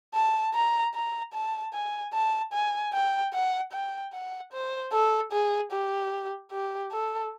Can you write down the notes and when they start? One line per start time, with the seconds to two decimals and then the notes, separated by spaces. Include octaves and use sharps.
0.14 A5
0.54 A#5
0.94 A#5
1.34 A5
1.74 G#5
2.14 A5
2.53 G#5
2.93 G5
3.33 F#5
3.73 G5
4.13 F#5
4.53 C5
4.92 A4
5.32 G#4
5.72 G4
6.52 G4
6.92 A4